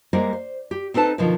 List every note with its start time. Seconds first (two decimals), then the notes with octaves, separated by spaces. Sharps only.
0.13 G3 G#3 A#3 A#4 C5 F#5
0.33 C5
0.71 G4
0.94 C4 D#4 A4 B4 A5
1.18 B2 D3 D#3 F3